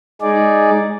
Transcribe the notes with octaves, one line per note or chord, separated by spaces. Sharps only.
G#3 D#4 G#4 D5